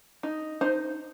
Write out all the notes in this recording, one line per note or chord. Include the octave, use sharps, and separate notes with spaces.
D#4
D#4 C5